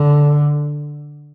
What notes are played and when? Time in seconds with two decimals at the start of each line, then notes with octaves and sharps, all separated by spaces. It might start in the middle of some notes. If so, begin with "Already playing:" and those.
Already playing: D3